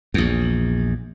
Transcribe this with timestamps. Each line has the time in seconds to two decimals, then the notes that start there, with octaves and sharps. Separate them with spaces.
0.14 A#1 E2